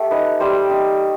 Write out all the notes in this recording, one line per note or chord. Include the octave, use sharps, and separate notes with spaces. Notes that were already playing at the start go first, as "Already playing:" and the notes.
Already playing: A3 G4
D#4 B4
G3 C5
D#4